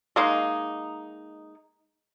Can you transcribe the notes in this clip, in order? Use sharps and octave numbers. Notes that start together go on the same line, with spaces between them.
G#3 A#3 D#4